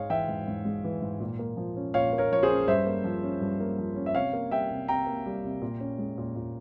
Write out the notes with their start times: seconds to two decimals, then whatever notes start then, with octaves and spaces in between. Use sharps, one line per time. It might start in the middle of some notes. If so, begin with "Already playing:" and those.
Already playing: G#2 G#3 C#5 F5
0.10 E3 E5 G5
0.28 G#2
0.47 G#2
0.65 G#3
0.84 E3
1.02 G#2
1.20 A#2
1.39 A#3
1.57 F3
1.76 C#4
1.94 A#2 C#5 F5
2.13 A#3
2.18 A#4 C#5
2.32 F3 C#5
2.43 G#4 C5
2.50 C#4
2.68 G2 C5 E5
2.86 A#3
3.04 F3
3.23 C#4
3.41 G2
3.60 A#3
3.78 F3
3.96 C#4
4.06 E5
4.15 C3 C#5 F5
4.33 A#3
4.51 G3 E5 G5
4.71 C3
4.88 C3 G5 A#5
5.06 A#3
5.26 G3
5.44 C3
5.62 A#2
5.80 C#4
5.98 G#3
6.18 A#2
6.36 A#2